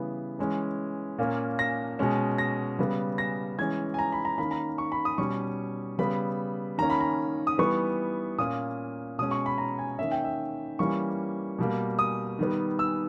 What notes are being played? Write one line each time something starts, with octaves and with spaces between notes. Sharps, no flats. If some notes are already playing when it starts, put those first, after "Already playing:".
Already playing: C#3 E3 G3 B3
E3 G#3 C#4
A#2 A#3 C#4
A#6
B2 G#3 C#4
A#6
C#3 G3 B3
A#6
E3 G#3 C#4 G#6
G#5
A#5
B5
A#5
D#3 A#3 C#4 B5
A#5
C#6
B5
D#6
B2 G3 C#4 C#6
C#3 G3 B3 B5
D#3 A#3 C#4 A#5
B5
A#5
D#6
E3 G3 B3 C#6
A#2 A#3 C#4 D#6
B2 G#3 C#4 D#6
C#6
B5
A#5
G#5
D#3 A#3 C#4 E5
G5
E5
E3 G3 A#3 C#4 C#6
B2 G3 A#3
D#6
D#3 G3 B3
E6